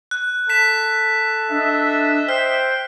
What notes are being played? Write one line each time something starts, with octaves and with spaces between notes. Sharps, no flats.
F#6
A4 B6 E7
D4 D#5 E5
C5 G5 F6